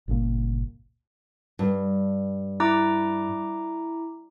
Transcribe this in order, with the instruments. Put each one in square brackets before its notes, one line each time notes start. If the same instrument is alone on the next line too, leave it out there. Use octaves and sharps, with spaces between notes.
[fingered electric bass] G1 C#2 A#2 A#3
[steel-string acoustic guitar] G2
[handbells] E4 A#5 D6